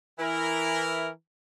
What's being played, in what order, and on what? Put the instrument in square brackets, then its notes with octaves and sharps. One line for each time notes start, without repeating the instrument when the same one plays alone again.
[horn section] E3 E4 A#4